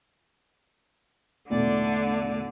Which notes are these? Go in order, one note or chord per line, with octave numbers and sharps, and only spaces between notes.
E1 B1 A2 D3 A3 D5